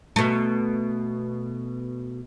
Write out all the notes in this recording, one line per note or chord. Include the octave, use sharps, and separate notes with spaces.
B2 A3